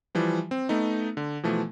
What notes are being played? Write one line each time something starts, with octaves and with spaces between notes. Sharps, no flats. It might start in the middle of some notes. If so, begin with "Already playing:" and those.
E3 F3 G3
C4
A3 B3 D#4
D3
B2 E3 F3 A3